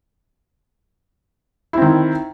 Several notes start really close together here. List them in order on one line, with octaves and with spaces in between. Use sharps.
E4 C4 D#3